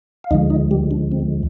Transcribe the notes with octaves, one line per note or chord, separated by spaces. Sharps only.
F5
D2 D3 F3 G#3 D#4 D#5
D#4 D#5
G3 G4
D4
C4